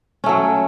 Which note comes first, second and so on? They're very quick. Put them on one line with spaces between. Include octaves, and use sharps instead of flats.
C#4 A3 F#3